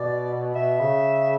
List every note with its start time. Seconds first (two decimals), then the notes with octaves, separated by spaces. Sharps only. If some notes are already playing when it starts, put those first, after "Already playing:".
Already playing: B2 D5
0.55 B2 E5
0.80 C#3